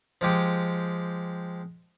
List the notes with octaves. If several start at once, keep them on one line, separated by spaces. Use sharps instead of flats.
F3 G#3 G4